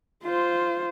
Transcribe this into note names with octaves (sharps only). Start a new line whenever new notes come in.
F4 C5